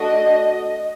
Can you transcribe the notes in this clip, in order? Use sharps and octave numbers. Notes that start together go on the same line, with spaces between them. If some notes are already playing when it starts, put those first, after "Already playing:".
Already playing: A3 D4 F#4 A4 D#5